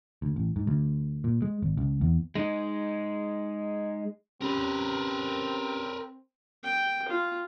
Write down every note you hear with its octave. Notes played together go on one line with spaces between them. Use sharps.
D2
A1
G#2
D2
A#2
G#3
G#1
C#2
E2
G#3 D#4
C4 C#4 G4 A#4 B4
G5
F4